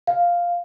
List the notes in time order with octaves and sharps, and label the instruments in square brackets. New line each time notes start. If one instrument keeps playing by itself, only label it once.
[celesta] F5